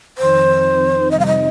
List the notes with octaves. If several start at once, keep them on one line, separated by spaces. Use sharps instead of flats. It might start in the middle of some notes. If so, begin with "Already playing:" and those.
F2 D#3 C4 D#4 C5
F2 C3 G3 C4 D#4 D#5
F5
D#5